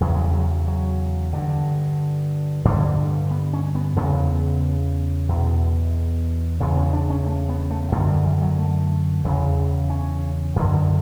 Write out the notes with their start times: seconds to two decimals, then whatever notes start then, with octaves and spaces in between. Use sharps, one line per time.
0.01 E2 C#3 F#3
0.09 G3
0.16 F#3
0.24 G3
0.33 F#3
0.68 F#3
1.33 G2 D3
2.65 G2 D3 G3
3.31 B3
3.53 C#4
3.75 B3
3.96 E2 C#3 B3
5.29 E2 B2
6.60 E2 C#3 B3
6.77 C#4
6.93 D4
7.10 C#4
7.26 A3
7.49 B3
7.71 A3
7.92 F#2 A3
7.96 D3
8.08 G3
8.25 E3
8.42 F#3
8.58 A3
9.24 E2 C#3
9.90 C#4
10.56 F#2 D3